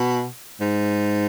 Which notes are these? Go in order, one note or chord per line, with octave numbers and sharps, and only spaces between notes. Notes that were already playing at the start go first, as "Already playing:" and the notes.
Already playing: B2
G#2